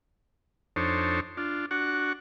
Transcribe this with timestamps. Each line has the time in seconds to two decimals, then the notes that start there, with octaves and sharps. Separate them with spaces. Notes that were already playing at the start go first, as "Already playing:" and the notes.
0.76 F2 D4 D#4 A4 C5 C#5
1.37 D4 F4
1.71 D4 F#4 F#5 C#6